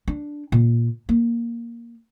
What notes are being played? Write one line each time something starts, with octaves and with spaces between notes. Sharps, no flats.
D4
A#2
A#3